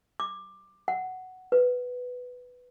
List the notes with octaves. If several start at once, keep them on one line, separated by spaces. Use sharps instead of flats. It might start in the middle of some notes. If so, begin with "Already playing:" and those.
D6
F#5
B4